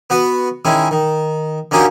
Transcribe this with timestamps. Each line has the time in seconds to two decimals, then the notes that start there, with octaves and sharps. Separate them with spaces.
0.10 B3 F#4 B4
0.65 D#3 G#3 C#4 E4
0.91 D#3
1.71 D3 A#3 C#4 D#4 F#4 G4